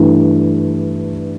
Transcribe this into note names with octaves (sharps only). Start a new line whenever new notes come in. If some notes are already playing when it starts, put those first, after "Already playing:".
Already playing: G2 E3 A3 D4